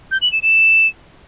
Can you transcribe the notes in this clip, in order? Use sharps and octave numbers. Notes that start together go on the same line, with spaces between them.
G6
F#7
E7
E7